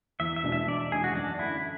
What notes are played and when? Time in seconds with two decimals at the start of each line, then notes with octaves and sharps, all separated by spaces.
0.20 E2 E5
0.36 E5
0.44 B2 G#3 D4
0.52 E5
0.67 E2 D5
0.92 B2 G#3 D4 G#4
1.04 F#4
1.15 F#2 D4
1.39 D3 A3 E4